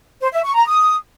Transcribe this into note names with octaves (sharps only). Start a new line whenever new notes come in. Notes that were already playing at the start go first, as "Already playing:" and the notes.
C5
E5
C#6
A#5
D#6